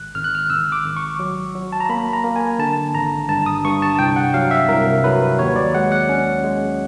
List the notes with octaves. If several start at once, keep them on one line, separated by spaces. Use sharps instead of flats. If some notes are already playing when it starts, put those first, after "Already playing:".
Already playing: G#1 F#6
G#1 F6
F#6
F6
G#1 E6
D6
G#1
C#6
F#3
F#3
A5
A#5
A#3 B5
A#5
A#3
G#5
D3 A5
G#1 A#5
G2 A5
D#6
G2 C#6
A5
C2 G5
F#5
F#3 F5
E5
C2 A#4
F#3 B4
D#2 C#5
D5
G#3 F#5
F#5
C#4
G#3